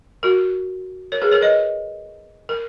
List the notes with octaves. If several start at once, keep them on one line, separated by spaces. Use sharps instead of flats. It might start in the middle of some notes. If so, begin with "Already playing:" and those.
F#4 A#4
A#4 C#5
G#4 B4
A#4 C#5
B4 D#5
A#4